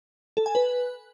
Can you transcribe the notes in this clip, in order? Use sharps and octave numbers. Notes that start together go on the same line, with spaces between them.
A4
G#5
B4